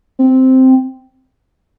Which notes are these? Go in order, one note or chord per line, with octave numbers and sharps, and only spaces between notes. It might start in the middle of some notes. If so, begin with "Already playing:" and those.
C4